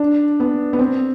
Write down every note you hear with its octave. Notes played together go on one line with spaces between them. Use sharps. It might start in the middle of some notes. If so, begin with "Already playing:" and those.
Already playing: D4
B3
B3
C4